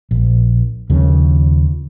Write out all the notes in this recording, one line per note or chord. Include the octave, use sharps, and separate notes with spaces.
A#1
D#2 C#3 F3